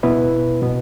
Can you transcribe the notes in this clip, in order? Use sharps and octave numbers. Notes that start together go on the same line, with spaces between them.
B2 B3 E4 B4
B2 B3